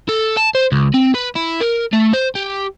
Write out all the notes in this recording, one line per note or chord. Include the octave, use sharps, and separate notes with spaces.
A4
A5
C5
C#2
C4
B4
E4
A#4
A3
C5
G4